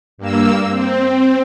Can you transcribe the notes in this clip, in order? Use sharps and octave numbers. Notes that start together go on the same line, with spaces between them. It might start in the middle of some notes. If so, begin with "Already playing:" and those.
G2 A#3 E6
C4